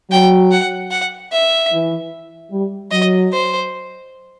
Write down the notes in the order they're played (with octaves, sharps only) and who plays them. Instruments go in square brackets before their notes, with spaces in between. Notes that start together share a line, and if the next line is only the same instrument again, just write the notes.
[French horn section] F#3 [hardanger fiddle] G5
[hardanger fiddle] F#5
F#5
E5
[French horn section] E3
G3
[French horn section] F#3 [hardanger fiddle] D#5
[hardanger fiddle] C5